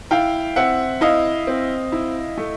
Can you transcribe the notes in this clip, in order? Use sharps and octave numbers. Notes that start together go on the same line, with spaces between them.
E4 F5 G5
C4 E5 F#5
E4 D#5 F5
C4
E4
A3